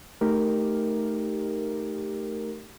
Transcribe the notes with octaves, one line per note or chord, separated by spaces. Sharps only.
A3 D#4 G4 A#4